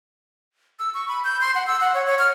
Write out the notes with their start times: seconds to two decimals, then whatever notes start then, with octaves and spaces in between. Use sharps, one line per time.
0.79 E6
0.94 C#6
1.08 B5
1.24 G6
1.41 C6
1.55 F#5
1.67 E6
1.80 F#5
1.94 C#5
2.07 C#5
2.19 F6